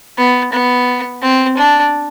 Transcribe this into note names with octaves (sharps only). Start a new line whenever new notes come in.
B3
B3
C4
D4